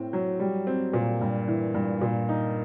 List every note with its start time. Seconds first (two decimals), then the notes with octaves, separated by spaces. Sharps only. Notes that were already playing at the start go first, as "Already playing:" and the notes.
Already playing: A2 C4
0.13 F#3
0.40 G3
0.67 C4
0.93 A#2
1.21 G2
1.48 E3
1.74 G2
2.01 A#2
2.29 D#4